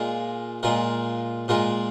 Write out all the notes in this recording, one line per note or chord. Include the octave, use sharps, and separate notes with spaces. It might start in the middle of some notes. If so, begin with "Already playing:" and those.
Already playing: A#2 G#3 F4 A#4
A#2 G#3 F4 A#4
A#2 G#3 F4 A#4